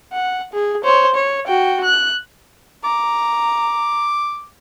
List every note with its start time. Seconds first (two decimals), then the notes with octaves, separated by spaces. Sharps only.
0.12 F#5
0.53 G#4
0.84 C5 C#5
1.15 C#5
1.47 F#4 G5
1.84 F#6
2.84 A#5 D6